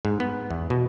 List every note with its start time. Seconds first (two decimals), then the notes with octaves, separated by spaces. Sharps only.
0.05 G#2
0.20 B3
0.51 E2
0.70 B2